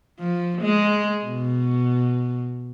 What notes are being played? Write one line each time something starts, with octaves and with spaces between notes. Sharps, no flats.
F3
G#3
B2